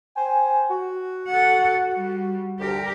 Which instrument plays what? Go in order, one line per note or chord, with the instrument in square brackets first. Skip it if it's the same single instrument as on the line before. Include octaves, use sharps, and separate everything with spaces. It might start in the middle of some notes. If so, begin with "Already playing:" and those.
[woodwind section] C5 G5 G#5
F#4
[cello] A4 F#5
G3
[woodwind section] D2 [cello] G4 A#4